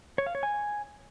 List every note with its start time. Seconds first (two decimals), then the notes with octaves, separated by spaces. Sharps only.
0.18 C#5
0.27 F5
0.35 C#5
0.43 G#5